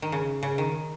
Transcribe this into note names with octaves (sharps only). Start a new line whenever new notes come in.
D#3
C#3
C#3
D#3